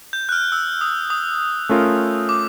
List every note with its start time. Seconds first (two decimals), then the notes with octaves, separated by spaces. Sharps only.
0.13 G6
0.29 F#6
0.32 F6
0.52 E6
0.81 D#6
1.10 D#6
1.69 A3 C#4 F4 A#4
2.29 D6